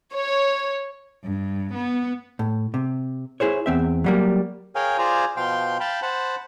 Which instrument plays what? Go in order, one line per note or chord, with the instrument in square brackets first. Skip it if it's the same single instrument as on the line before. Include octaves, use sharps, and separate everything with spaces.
[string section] C#5
[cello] G2
B3
[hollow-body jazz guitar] A2
C3
E4 G#4 C5 C#5
E2 C4 E5
F#3 G3 A#3
[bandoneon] G#4 A#4 C#5 F5 G5 G#5
F4 G#4 C5 D5 G#5 A#5
B2 F3 F5 G5 C6
F5 G5 A5 B5
C5 F#5 A5 B5